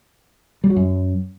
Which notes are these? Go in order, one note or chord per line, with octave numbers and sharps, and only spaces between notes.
G3
F#3
F#2